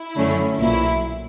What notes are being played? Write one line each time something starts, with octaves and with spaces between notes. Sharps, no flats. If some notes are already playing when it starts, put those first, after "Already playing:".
Already playing: E4
F#2 D3 F#3 A3 C#4
B1 A#2 F#3 E4